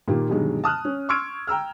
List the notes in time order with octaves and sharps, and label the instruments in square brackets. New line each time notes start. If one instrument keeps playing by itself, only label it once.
[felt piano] A#2 D#3 A#3 F4 G4
G2 B2 D3 D#3 F#3 G#3
A5 D#6 F6 F#6
C#4
C6 C#6 E6 F6 G#6 D7
G5 A#5 E6 F6